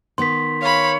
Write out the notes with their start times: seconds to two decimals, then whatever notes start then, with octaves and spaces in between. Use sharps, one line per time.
0.18 D#3 B3 C6 B6
0.61 C#5 F5 B5